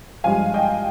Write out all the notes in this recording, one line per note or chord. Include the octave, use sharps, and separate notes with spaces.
G2 F3 G#3 F5 G#5
D#5 G5